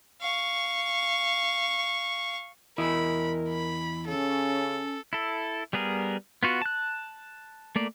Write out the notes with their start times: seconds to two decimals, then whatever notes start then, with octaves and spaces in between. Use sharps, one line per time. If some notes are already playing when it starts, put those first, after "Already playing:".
0.21 F5 C#6
2.78 E2 E4 A#4 D#5 B5
3.49 B5
4.08 C#3 C#4 A4
5.13 E4 A4
5.73 G3 B3 G#4 A#4
6.43 B3 F4 F#4
6.62 A5 F#6
7.76 A3 A#3 D5